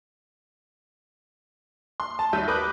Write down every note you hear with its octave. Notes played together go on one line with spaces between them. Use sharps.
C6
A5
D#2 F#3 G3 E5 G6 D#7
A#4 B4 D6 D#6 F#6 G6